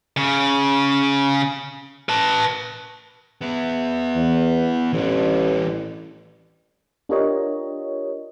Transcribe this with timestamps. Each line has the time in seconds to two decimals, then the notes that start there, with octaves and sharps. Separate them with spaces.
0.17 C#3
2.09 B4 A5
3.41 B3 E4
4.15 E2
4.93 A1 E3 D4
7.09 D4 F4 G4 A#4 C#5 D#5